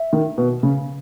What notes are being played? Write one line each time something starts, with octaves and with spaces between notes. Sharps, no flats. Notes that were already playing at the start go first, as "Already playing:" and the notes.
Already playing: E5
D#3
B2
C#3